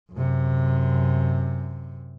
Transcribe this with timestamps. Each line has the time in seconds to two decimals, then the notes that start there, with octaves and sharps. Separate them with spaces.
0.12 F#2 C3